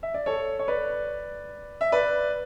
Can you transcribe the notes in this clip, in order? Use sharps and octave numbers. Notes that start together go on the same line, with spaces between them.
E5
D5
A4 C#5
C#5
B4 D5
E5
B4 D5